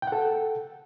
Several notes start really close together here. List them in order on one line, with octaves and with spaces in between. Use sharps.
G5 F#5 A4